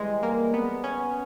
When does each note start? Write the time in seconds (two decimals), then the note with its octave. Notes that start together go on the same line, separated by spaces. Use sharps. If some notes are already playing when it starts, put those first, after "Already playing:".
Already playing: E3 G3 G#3
0.23 A#3
0.54 B3
0.84 C#4